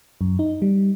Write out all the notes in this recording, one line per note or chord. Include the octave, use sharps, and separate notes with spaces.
F#2
D#4
G3